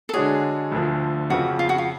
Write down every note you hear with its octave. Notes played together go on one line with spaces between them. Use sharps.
A4
D3 G#3 D4 F#4 G#4 C#5
D2 D3 F3
F2 C#3 F3 F#4
F4
F#4
F4